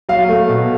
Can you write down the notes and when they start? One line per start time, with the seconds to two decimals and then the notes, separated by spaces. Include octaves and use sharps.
0.09 F#3 F5
0.29 A3
0.49 B2